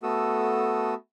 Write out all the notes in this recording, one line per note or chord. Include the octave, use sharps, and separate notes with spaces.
A3 B3 F#4 A4 D#6 E6